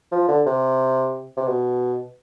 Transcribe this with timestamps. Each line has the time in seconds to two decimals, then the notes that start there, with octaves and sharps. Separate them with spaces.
0.12 F3
0.28 D3
0.46 C3
1.37 C3
1.47 B2